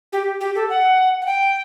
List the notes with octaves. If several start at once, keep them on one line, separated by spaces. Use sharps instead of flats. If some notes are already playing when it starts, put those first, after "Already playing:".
G4
G4
A4
F#5
F#5
G5